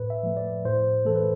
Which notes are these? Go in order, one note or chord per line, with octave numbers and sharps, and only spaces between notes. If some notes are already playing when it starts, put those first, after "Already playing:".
Already playing: A2 B4
E5
F3 A3
D5
A2 C5
E3 A3 A4
B4